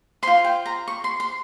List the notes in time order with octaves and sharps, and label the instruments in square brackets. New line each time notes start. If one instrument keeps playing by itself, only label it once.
[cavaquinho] F4 C5 C6
G5
A#5
C#6
C6
C6